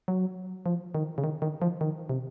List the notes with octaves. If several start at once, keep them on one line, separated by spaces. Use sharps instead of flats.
F#3
F3
D#3
C#3
D#3
D#3
F3
D#3
C3